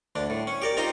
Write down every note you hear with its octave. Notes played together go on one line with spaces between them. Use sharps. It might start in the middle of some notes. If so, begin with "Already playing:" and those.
D2 D4
A2
C#4
G4 A#4 D5
C4 D#4 F4 C5 G5 A#5